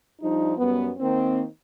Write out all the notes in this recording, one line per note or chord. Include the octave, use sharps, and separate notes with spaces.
F3 G3 D4 D#4
F#2 G3 B3
D#3 A#3 C4